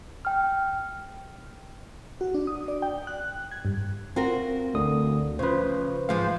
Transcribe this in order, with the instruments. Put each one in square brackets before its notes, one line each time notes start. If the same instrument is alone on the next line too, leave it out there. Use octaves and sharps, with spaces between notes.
[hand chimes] G5 F6
[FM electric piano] F#4
D4
D#6
D5
G5
F#6
G#6
G2
[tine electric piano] C4 [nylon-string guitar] F4 F#4 A#4
[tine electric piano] D2 D3 D#6
[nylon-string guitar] C#3 F3 [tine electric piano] B4 C5
[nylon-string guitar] G#2 F3 G#3 [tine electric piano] F5